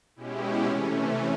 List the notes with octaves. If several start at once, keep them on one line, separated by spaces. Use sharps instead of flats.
B2 G#3 C#4 E4 G4
C3 E3 A3 C#4